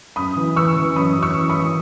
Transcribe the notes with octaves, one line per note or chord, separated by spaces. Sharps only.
F#2 B5 D#6
E3
E3 C#6 E6
E3
F#2 B5 D#6
F#2
C#6 E6
E3
B5 D#6
E3